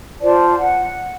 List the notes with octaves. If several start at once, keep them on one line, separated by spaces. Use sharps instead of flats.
F4 C5 D5 A5
F#5